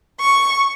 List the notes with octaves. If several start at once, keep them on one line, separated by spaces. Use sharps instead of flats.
C#6